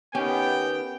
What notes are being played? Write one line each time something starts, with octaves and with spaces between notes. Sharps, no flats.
D#3 B3 C#4 G4 G5